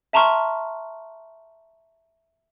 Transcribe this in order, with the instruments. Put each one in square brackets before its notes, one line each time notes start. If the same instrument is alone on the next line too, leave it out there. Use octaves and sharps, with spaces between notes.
[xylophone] E5 A5 A#5 C6 C#6 F6